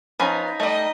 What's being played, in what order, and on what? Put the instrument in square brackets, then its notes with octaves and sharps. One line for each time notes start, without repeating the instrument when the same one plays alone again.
[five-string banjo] F3 B3 C#4 [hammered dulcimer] D#4 A#5 B5
[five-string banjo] G3 A3 [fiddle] D#5